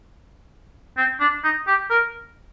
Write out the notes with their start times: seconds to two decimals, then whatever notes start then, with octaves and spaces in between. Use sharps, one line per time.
0.97 C4
1.20 D4
1.44 D#4
1.67 G4
1.91 A#4